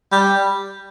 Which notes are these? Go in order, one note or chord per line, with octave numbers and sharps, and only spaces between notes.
G3